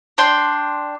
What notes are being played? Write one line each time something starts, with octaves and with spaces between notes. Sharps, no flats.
D4 G5 C6